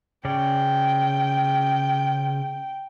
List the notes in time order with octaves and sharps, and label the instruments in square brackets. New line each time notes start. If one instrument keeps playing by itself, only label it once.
[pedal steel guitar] C#3 C#4 D5 [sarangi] G5